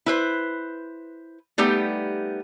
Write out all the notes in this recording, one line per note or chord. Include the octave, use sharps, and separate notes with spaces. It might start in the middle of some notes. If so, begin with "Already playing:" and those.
E4 B4 C5
G3 A3 B3 D#4 G4